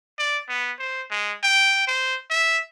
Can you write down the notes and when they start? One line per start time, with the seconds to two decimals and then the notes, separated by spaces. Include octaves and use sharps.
0.19 D5
0.49 B3
0.79 C5
1.11 G#3
1.43 G5
1.87 C5
2.30 E5